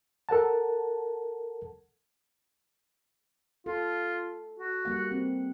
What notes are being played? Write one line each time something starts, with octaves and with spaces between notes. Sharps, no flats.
A4 A#4 F#5 A5
F4 A4
F#4
G3 A#3 F#5
C4